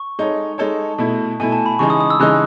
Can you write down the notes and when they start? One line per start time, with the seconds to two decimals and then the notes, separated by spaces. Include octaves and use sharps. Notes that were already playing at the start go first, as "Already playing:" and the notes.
Already playing: C#6
0.19 G#3 D#4 A4 C#5
0.58 G#3 D#4 A4 C#5 A5
0.98 B2 A3 E4
1.40 B2 A3 E4 G#5
1.52 A5
1.66 B5
1.79 C#3 E3 G#3 D#4 C#6
1.90 D#6
2.00 D#6
2.10 E6
2.20 C#3 E3 G#3 D#4 F#6